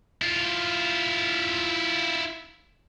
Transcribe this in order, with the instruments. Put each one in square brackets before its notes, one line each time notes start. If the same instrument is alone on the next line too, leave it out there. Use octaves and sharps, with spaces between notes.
[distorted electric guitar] E4 F4